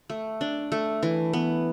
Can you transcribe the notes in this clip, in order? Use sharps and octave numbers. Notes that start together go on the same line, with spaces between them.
A3
D4
A3
E3
B3